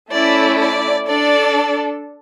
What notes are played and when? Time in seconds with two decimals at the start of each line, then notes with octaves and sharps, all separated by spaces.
0.12 A3 C#4 E4 A4 D5
0.61 D5
1.08 D4 A4 D5